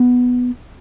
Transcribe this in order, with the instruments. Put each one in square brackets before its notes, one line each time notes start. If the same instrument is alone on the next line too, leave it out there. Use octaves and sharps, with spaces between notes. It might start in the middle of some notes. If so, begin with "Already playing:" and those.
Already playing: [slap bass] B3